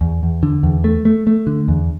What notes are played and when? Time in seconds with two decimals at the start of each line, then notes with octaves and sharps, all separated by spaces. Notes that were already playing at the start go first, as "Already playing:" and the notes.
0.01 E2
0.23 E2
0.43 D3
0.63 E2
0.84 A3
1.05 A3
1.27 A3
1.47 D3
1.68 E2